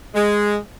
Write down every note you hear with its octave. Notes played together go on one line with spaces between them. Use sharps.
G#3